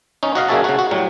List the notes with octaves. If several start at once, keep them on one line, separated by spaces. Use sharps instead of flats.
C#4 D#4
F#4 D#5 F5
C#3 A#3 F#4 G#4 E5 A5
C#3 F#4
F#4
A2 F#3 G3